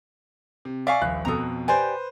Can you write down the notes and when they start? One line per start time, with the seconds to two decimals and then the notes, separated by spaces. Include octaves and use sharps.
0.65 C3
0.87 D5 E5 F5 G#5 C#6
1.02 D#1 A#1 F#6
1.25 F2 B2 A4 A#5 D#6
1.68 G4 B4 C5 D5 G#5